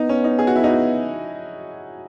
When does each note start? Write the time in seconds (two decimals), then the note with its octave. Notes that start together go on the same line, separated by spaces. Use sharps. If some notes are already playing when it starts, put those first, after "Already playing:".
Already playing: B3 D#4
0.09 C#4
0.24 D#4
0.39 G#4
0.47 F#4
0.55 E4
0.64 D#4 F#4